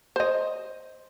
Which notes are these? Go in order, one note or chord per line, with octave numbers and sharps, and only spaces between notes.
C5 D#5